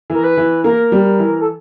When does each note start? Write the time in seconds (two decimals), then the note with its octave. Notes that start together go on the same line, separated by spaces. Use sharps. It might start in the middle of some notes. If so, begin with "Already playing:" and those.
0.10 E3 A#4
0.24 B4
0.37 E3
0.64 A#3 A#4
0.92 G3
1.19 E3
1.41 A4